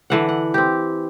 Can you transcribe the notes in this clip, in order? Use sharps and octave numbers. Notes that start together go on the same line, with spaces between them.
D3 E3 F#5
F#5
C4 G4